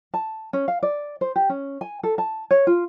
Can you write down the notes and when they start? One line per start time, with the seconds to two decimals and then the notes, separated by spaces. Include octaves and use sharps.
0.14 A5
0.53 C#4
0.68 F5
0.83 D5
1.21 C5
1.36 G4
1.49 C#4
1.81 G#5
2.03 A4
2.18 A5
2.51 C#5
2.67 F4